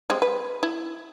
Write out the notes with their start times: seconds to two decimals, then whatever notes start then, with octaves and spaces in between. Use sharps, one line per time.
0.10 G3 G#3 C4
0.22 B4
0.63 E4